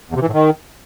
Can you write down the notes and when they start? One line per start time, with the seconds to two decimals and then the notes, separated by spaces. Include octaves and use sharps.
0.10 E2
0.16 C3
0.22 E3
0.28 A2
0.34 D#3